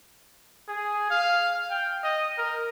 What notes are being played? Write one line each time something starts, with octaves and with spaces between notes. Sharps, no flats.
G#4
F5
G5
D#5
A#4